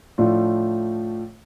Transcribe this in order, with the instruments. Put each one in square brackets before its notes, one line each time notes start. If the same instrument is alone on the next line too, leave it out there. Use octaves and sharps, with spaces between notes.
[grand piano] A2 F3 A3 D4 F4